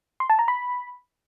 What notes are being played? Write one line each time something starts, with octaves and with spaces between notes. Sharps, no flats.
C6
A5
A#5
B5